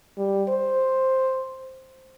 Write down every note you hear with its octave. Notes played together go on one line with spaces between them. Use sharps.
G3
C5